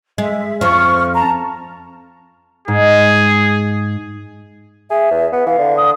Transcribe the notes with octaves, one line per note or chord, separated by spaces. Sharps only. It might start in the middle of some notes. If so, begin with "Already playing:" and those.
G#3 E5
F2 F3 C#6 F6
A5 A#5
G#2 G#4
G#4 E5
E2
B3
E3 F5
D3
D#6